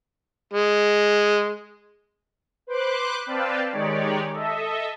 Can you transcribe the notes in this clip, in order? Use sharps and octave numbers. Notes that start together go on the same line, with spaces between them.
G#3
B4 C5 C6 D6 F#6
C4 B4 D5 F5 G5 A5
D#3 G#3 D#4 G4 C#5 D5
A4 D#5 E5